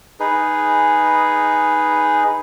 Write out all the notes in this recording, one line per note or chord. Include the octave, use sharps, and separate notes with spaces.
D#4 G#4 B4